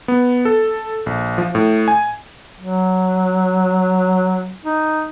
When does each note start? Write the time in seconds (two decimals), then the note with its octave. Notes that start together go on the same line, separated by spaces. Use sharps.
0.08 B3
0.45 A4
1.06 A#1
1.38 F3
1.55 A2
1.88 G#5
2.61 F#3
4.65 D#4